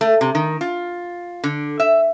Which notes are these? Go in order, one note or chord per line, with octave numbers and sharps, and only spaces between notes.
A3
C3
D#3
F4
D3
E5